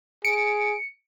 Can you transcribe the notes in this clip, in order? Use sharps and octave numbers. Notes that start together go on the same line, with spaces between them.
G#4 C#7 D7